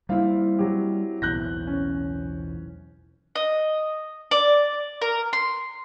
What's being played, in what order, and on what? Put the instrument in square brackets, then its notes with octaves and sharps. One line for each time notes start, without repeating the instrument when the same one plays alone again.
[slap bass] G3 A#3 [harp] C4 E4 [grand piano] F5
[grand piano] F#3 G4
[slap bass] B1 E2 A2 [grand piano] F#6 G6 A#6
[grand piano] C#4
[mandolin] D#5
D5
A#4
C6